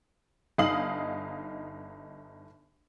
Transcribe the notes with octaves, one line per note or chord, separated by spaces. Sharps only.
G1 D#4 F5 D#6 C7 F#7